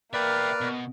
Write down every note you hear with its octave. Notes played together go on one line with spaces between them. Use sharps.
A#3 B4 D5 E5 G5 F6
B2